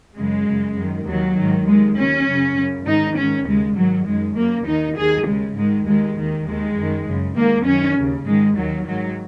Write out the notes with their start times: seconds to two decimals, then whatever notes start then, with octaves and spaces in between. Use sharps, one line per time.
0.16 F#2 C#3 G#3
0.46 F#2 C#3
0.76 F#2 D#3
1.06 D#2 D#3 F#3
1.37 G#2 D#3
1.66 D#2 D#3 G#3
1.96 D#2 C#3 C#4
2.26 F#2 C#3
2.56 F#2 C#3
2.86 G#2 D#3 D#4
3.16 G#2 D#3 C#4
3.46 D#2 C#3 G#3
3.76 G#2 D#3 F#3
4.06 F#2 D#3 G#3
4.36 F#2 C#3 A#3
4.66 D#2 D#3 D#4
4.96 D#2 D#3 G#4
5.26 D#2 C#3 G#3
5.56 G#2 D#3 G#3
5.86 D#2 D#3 G#3
6.16 D#2 D#3
6.46 D#2 D#3 G#3
6.76 F#2 D#3
7.06 F#2 C#3
7.36 G#2 D#3 A#3
7.66 F#2 D#3 C#4
7.96 D#2 C#3
8.26 G#2 D#3 G#3
8.56 D#2 D#3 F#3
8.85 G#2 D#3 F#3